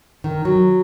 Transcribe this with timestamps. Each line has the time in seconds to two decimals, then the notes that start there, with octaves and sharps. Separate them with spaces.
0.24 D#3
0.45 F#3